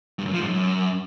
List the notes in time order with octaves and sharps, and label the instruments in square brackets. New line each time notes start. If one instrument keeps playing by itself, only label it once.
[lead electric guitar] G2
F#2
F3
G#2
F#2